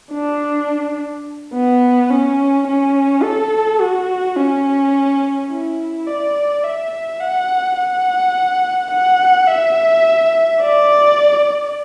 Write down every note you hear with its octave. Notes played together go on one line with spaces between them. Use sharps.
D4
B3
C#4
C#4
A4
F#4
C#4
E4
D5
E5
F#5
F#5
F#5
E5
D5